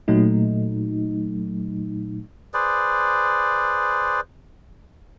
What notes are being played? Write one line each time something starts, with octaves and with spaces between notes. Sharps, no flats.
A#2 F#3 A3 D#4
G#4 B4 C5 D5